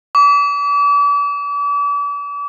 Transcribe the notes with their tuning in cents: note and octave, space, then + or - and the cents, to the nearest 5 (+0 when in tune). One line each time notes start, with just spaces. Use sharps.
D6 -40